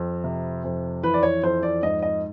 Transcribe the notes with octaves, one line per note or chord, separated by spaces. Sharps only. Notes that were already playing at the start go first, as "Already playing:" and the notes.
Already playing: F2
C3
F2
E3 B4
D5
C#5
F2 C5
D5
G#2 D#5
D#5